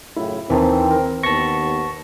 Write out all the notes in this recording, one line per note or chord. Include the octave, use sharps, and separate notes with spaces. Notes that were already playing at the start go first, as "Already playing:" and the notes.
F#2 A2 C#3 E4
D#2 D#3 E3 C4 A5 A#5
A#4
D#2 B3 A5 C#6 A#6